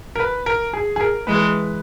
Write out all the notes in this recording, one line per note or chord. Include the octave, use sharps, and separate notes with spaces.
A#4
B4
A#4
G#4
G#4
A#4
E3 G#3 B4